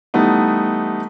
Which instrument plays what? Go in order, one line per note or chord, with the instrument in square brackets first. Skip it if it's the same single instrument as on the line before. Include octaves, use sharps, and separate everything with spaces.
[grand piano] E3 G3 A3 B3 D#4